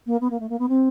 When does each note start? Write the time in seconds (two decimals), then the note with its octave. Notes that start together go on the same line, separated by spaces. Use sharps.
0.06 A#3
0.21 B3
0.31 A#3
0.40 A3
0.49 A#3
0.59 B3
0.69 C4